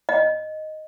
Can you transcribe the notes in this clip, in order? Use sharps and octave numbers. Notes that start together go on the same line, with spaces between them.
D#5